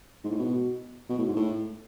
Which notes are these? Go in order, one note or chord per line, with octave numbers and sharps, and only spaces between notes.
G#2
A2
B2
B2
A2
G#2
A2